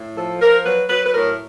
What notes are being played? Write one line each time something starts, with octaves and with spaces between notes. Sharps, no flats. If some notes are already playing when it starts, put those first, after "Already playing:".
Already playing: A2
F3 A4
F3 A#4
F#3 B4
F#3 B4
B4
A2 A#4